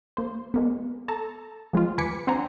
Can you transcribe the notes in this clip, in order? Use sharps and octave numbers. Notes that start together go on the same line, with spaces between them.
A#3 C5
G#3 A#3 B3
A4 A5 A#5
F3 G#3 C4 F4
D#2 B4 G#5 D6 B6 C#7
C4 D4 C5 F#5 G#5 A#5